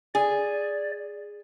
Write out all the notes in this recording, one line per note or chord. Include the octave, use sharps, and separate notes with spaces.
G#4 D5